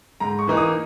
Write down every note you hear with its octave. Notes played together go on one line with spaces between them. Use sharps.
G#2 A#5
C#6
E3 A#3 D#4
D#6